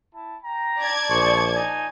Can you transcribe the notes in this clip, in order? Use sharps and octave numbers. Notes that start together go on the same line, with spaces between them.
E4 A5
G5 A#5
D5 A5 G#6
A#1 G#4 C5 C#6
D#4 G#5